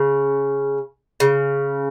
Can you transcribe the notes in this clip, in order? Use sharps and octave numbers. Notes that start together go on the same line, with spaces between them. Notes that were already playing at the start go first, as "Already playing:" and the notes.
Already playing: C#3
C#3